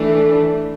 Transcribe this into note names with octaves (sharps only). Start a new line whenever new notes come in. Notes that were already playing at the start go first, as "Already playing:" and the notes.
Already playing: E3 A3 D4